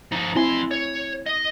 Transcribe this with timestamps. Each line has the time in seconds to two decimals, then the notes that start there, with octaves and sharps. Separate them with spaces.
0.12 F3 D#4
0.35 F2 C4 E4 G#5 C6
0.71 C#5
1.26 D#5